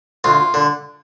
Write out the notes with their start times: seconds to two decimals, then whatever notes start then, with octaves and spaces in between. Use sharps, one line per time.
0.24 D2 F4
0.54 D3